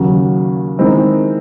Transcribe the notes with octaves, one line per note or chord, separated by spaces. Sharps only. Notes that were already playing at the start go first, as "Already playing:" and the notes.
Already playing: D#2 C#3 F#3
D#3 G#3 C4 E4